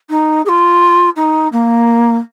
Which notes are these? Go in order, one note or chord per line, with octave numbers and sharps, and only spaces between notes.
D#4
G#4
F4
D#4
A#3